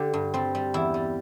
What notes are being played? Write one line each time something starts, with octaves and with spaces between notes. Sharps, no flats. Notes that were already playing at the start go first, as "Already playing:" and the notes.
Already playing: D3 G4
G2
G3 C4
G3
E2 E4
G3